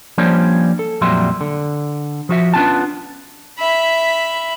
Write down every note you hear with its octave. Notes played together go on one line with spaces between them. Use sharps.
F3 G3 A#3 C#4 D4 C5
A4
F2 A#2 F#3 G3 E5 C6
D3
F3 F#4 E5
B3 C#4 D4 F4 G#5 A5
E5 B5